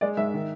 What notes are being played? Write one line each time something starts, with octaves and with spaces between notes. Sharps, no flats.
G#3 D5
G#2 E5
D#3